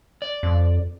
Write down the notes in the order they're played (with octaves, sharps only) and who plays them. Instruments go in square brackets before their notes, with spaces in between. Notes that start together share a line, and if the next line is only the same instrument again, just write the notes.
[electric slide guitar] D5
[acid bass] F2